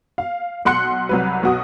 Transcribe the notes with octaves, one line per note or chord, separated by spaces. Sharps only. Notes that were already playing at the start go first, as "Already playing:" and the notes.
F5
B1 F#5 C6 F#6 C#7
C2 F#3 B4
B1 F#4 D#6